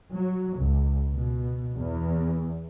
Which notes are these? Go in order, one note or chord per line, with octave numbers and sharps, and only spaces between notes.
F#3
C#2
B2
E2